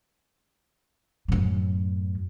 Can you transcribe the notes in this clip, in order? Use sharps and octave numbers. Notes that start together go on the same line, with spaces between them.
F#2 A2